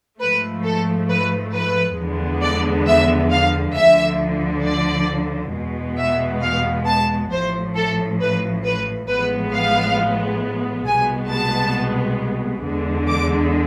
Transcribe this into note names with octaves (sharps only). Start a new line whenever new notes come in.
G#2 F3 A3 B4
A4
B4
B4
E2 D3 F3 G#3 B3
D5
E5
F5
D2 D3 F3 E5
D5
E2 B2 G#3 B3
E5
F5
A5
A1 A2 F3 C5
A4
B4
B4
A1 A2 F3 G#3 B3 B4
F5
C2 B2 G#3 B3 G#5
A5
E2 D3 G#3
D6